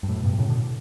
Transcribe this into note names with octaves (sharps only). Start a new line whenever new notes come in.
G2
F#2 A2
G2 B2
A2 C#3
B2 D3